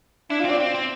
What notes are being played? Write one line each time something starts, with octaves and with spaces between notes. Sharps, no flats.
D4 E4
F4
C4
D5
C4
C4